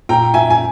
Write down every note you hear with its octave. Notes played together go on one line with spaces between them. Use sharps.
A#2 G5 A#5
E5 G#5
G#5